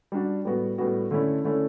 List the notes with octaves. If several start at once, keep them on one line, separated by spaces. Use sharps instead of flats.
G3 D4 F#4
A2 G3 B3 F#4
A2 G3 B3 F#4
D3 A3 C#4 E4
D3 A3 C#4 E4